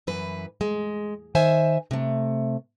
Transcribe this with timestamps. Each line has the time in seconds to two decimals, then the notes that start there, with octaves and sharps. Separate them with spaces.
0.07 F#2 E3 B4
0.61 G#3
1.35 D#3 C5 E5 G#5
1.91 C3 A3